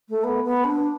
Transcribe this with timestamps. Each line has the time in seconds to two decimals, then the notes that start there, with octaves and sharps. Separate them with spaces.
0.09 A3
0.23 B3
0.44 B3
0.64 D4